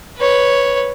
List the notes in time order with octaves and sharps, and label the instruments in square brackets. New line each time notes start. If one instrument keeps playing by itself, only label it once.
[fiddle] B4 C#5